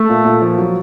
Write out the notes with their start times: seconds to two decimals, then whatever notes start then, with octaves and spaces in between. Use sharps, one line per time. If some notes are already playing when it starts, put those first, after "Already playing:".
Already playing: A3
0.09 A#2
0.25 A#2
0.42 F3
0.58 F#3